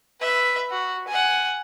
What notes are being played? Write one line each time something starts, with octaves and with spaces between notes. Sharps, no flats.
B4 E5
F#4
F#5 G#5